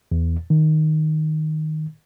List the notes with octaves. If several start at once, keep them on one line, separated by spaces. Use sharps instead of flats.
E2
D#3